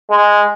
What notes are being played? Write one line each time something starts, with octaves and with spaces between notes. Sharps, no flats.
G#3